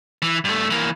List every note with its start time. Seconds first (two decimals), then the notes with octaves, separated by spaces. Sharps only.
0.22 E3
0.44 G2 A3
0.70 E3 A#3